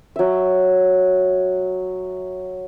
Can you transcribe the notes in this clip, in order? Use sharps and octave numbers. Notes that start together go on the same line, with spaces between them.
F#3 E5